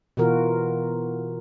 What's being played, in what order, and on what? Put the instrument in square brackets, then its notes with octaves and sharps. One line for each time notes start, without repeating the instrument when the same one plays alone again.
[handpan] B2 E3 F4 F#4 A#4